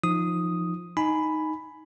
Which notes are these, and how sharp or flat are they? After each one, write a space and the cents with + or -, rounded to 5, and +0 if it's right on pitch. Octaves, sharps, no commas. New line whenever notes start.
F3 +0 D#4 +0 D#6 +0
D#4 +0 G#5 +15 B5 +5